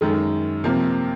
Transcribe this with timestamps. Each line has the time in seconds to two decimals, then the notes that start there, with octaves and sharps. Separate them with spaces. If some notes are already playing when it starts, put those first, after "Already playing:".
0.01 F#2 D#3 G#3
0.64 C3 F3 A#3